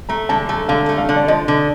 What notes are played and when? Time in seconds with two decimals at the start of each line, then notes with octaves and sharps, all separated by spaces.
0.09 A3 A#5
0.29 D3 A5
0.49 A3 A5
0.68 D3 F5
0.89 A3
0.98 F5
1.09 D3
1.16 D5
1.28 F3 D#5
1.48 D3